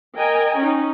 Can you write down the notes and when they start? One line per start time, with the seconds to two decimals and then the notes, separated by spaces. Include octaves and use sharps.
0.17 A#4 D#5 G5 G#5 A#5
0.59 C#4 D#4